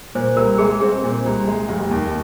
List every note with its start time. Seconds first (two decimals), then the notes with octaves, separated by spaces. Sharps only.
0.15 A#2 C5
0.36 C2 A#4
0.58 G#3 G#4
0.81 C4 G#4
1.03 A#2
1.26 C2
1.47 G#3
1.69 F1
1.91 D#2